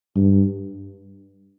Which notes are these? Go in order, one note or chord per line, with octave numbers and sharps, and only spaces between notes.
G2